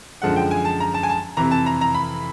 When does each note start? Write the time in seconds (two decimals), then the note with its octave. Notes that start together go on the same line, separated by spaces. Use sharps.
0.22 F#2 D3 F3 G#3 F#5
0.36 G5
0.51 G#5
0.65 A5
0.80 A#5
0.94 A5
1.03 G#5
1.09 A5
1.37 F2 C3 E3 A#5
1.51 A5
1.66 A#5
1.81 A#5
1.95 B5